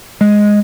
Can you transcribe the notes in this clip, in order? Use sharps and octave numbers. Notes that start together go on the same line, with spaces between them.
G#3